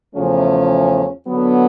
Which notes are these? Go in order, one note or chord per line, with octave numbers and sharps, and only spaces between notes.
E2 C#3 F3 A3 C#4
D3 F#3 B3